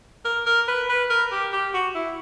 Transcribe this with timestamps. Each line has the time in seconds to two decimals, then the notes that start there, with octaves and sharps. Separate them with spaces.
0.25 A#4
0.46 A#4
0.68 B4
0.89 B4
1.10 A#4
1.32 G4
1.52 G4
1.74 F#4
1.95 E4